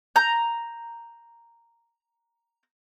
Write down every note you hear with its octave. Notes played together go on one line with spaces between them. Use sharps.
A#5 G6